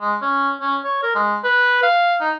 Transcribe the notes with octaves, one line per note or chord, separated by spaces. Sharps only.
G#3
C#4
C#4
C#5
A#4
G#3
B4
F5
D#4